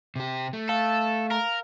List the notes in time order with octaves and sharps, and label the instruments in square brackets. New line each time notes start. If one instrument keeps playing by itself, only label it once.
[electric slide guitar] C3 G4
A3
[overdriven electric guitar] A4 [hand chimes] F5
[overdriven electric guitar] A#4